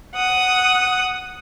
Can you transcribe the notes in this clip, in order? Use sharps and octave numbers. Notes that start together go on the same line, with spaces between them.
F#5 D#6